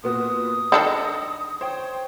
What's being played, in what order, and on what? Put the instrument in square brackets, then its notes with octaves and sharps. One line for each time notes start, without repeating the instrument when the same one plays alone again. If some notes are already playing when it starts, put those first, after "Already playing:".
[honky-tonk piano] A#2 B3 F#4 [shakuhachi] D#6
[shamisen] D#3 D4 A4 [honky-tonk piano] A#6 C#7
[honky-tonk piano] C5 C#5 G5